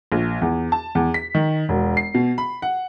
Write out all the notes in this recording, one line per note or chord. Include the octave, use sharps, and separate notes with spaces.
A#1
E2
A5
E2
B6
D#3
E1
C7
B2
B5
F#5